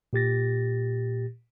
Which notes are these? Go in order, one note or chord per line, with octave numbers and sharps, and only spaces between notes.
A#2 G4 A6 A#6